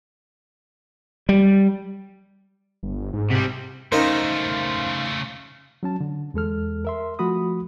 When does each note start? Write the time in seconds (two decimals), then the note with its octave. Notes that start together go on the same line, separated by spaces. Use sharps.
1.29 G3
2.83 G1
3.13 G#2
3.31 C3 G3
3.92 C#3 A3 C#4 D#4 A#4 C5 F5
5.83 F#3 C#4 A5
6.01 D3
6.34 E2 G#3 A4 F6
6.85 A#4 E5 C6
7.19 F3 A3 F#4 B5 D#6